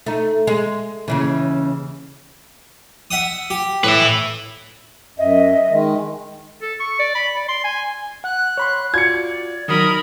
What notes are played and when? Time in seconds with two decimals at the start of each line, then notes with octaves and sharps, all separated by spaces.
0.06 A3 D#4
0.47 G#3
1.08 D#2 C#3 E3
3.11 E5 F#5 D#6
3.50 G4
3.84 A2 B4 E5
5.18 F#2 D#5 E5
5.70 D#3 G#3
6.62 A4
6.80 C#6
6.99 D5
7.15 B5
7.36 D5
7.48 C6
7.64 G#5
8.24 F#5 F#6
8.57 C#5 B5 C6
8.94 F4 F#4 D5 G#6 C#7
9.68 D#3 F#3 D#4 A#4 B5 D#6